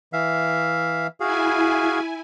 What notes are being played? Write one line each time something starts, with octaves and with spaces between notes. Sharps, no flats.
E3 E5 F5
E4 F#4 G#4 F5 G#5